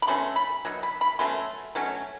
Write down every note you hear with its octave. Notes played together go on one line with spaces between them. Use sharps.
B5
B2 F#3 A3 C#4 C6
B5
B2 F#3
B5
B5
B2 F#3 A3 C#4 C6
B2 F#3 A3 C#4